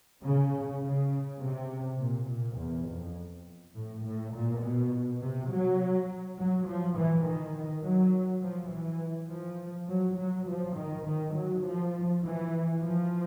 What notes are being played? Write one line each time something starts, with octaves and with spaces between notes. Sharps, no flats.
C#3
C#3
C3
A#2
A#2
E2
F2
A2
A2
A#2
B2
C3
F#3
F#3
F3
E3
D#3
F#3
F3
E3
F3
F#3
F#3
F3
D#3
D#3
F#3
F3
E3
F3